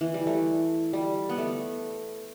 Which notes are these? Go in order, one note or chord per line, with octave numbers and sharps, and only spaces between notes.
E3
G3
A3
G3
B3
A3